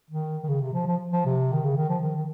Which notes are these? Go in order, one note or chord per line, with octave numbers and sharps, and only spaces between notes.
D#3
D#3
C#3
C3
F3
F3
F3
C3
D#3
C#3
D#3
F3
D#3
D#3